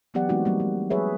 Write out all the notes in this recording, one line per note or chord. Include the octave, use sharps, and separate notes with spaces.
E3 F#3 B3 G4 D5 F#5
E3 G#3 A3 C4 D#4 F#4
F#3 G3 A3 A#3
G#3
F#3 G#4 B4 C#5 E5